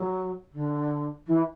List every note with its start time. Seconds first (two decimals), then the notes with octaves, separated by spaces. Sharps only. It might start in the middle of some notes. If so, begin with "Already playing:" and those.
Already playing: F#3
0.53 D3
1.27 E3